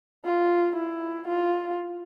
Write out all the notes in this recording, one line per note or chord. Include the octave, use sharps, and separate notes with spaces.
F4
E4
F4